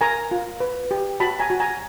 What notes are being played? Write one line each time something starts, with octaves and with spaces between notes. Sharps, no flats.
A#4 G#5 A#5
F4
B4
G4
F#4 A5 B5
G#5 A#5
F#4
G#5 A#5